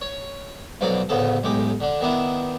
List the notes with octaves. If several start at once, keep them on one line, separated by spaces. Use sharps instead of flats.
C#5
B1 F2 B2 F#3 D5 D6
A1 D2 C#3 B3 A4
B1 A2 G#3 G4
D3 D4
D#3 B3 D4 E4